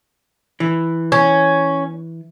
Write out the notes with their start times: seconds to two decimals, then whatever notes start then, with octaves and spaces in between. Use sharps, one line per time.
0.60 E3
1.12 C#4